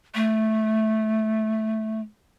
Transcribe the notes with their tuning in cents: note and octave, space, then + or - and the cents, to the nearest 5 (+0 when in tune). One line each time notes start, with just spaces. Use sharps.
A3 -10